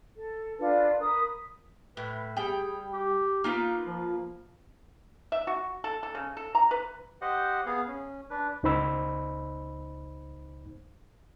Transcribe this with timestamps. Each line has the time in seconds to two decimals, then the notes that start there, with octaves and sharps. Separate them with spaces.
0.15 A4
0.59 D4 F4 A4 B4
0.99 A#4 B4 D#6
1.97 A2 B4
2.36 G3 G#4 G5
2.93 G4
3.44 A#3 D#4 F4 B4
3.87 F3
5.32 E5
5.47 F#4
5.84 A4
6.03 A4
6.15 C#3
6.37 A4
6.55 A#5
6.71 B4
7.22 G4 C5 D#5 F#5
7.66 B3 G#4 F5
7.88 C#4
8.30 D4 B4
8.63 C#2 D#4 C5 B5 E6